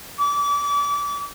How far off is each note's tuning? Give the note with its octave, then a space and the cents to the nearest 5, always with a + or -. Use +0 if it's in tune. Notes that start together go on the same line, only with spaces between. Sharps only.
D6 -30